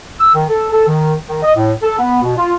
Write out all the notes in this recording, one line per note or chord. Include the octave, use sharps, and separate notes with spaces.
E6
D#3
A4
A4
D#3
D#3
D#5
A2
A4
B3
B2
F4